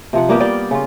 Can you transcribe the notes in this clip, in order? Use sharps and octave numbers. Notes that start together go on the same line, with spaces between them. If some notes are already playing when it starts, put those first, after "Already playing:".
C3 F3 F#5
G3 A#3 B3 G4
G3 D5 F5 G5
C#3 F4